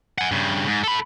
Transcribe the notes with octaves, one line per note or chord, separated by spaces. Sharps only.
F#5 G#5
G2 C#3
G#2
A4 B5